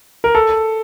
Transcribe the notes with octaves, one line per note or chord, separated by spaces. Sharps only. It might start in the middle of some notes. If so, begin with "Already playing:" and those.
A#4
A4